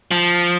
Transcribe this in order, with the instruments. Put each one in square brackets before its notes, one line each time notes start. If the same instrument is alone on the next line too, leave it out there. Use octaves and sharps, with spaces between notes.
[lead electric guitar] F3